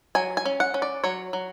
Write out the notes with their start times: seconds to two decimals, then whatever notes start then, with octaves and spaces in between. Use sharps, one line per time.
0.15 F#3 G#5
0.37 G#5
0.46 C#4
0.60 F#5
0.74 C#4
0.82 D5
1.04 F#3 C#5
1.33 F#3